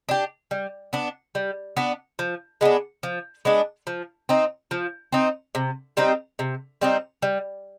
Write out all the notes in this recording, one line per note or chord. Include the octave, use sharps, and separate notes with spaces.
D4 G4
G3
B3 D4
G3
B3 D4
F3
G#3 B3 D4
F3
G#3 B3 D4
F3
C4 D#4
F3
C4 D#4
C3
G3 C4 D#4
C3
G3 C4 D#4
G3